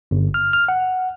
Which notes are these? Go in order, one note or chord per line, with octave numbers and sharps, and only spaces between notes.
G1
F6
F6
F#5